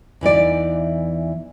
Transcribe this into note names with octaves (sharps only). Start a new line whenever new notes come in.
E2 E3 D#4 D5